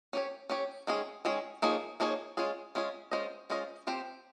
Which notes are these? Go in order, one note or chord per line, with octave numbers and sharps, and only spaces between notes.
C#4 G4 C#5
C#4 G4 C#5
D#3 G#3 C#4 G#4
D#3 G#3 C#4 G#4
F3 A#3 D#4 G#4 C#5
F3 A#3 D#4 G#4 C#5
G#3 C#4 F4 G#4
G#3 C#4 F4 G#4
G#3 C#4 F4 C5 D#5
G#3 C#4 F4 C5 D#5
F3 C4 G4 C5